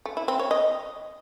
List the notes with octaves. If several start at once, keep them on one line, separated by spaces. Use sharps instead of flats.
A3
E4
C4
C#5
D#5